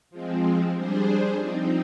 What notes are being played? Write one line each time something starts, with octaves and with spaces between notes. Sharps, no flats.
F3 G#3 C4
G3 D4 G#4 C5
F3 C4 D#4